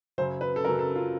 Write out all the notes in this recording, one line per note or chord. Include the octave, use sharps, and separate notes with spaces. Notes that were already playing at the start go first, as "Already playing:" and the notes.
F#2 C#3 F#3 C5
B4
A4
F#2 C#3 F#3 A#4
A4
F4